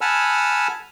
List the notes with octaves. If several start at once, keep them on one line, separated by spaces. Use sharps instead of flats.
F#5 G#5 A5 B5 E6 F6